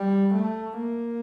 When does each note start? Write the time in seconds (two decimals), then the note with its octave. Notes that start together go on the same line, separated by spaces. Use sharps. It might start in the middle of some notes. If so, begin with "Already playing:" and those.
Already playing: G3
0.35 A3
0.79 A#3